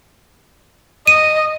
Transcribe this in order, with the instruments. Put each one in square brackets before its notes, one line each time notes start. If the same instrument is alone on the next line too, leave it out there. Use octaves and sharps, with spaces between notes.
[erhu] D#5 [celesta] D#7